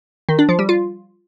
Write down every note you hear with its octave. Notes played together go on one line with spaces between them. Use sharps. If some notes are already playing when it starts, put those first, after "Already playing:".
D#3
D4
F3
G3
F4